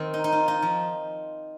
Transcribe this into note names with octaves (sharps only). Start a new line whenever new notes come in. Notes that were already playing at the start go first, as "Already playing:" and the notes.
Already playing: D#3 C4
D#4
D#4
F4
D#4
F3